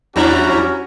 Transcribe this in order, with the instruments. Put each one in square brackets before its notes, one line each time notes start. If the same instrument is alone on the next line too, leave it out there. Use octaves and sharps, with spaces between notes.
[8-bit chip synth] E2 E4 A#5 [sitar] F3 G3 D4 [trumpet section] C#4 F#4